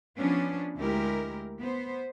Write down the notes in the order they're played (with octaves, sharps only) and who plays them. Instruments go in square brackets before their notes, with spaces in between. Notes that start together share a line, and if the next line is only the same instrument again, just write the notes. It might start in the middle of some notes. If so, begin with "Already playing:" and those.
[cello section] F3 B3 C#4 D4
D2 G#3 E4 G4 A#4
B3 C5